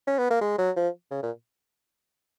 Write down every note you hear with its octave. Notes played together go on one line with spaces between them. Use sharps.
C#4
B3
A#3
G#3
F#3
F3
C#3
A#2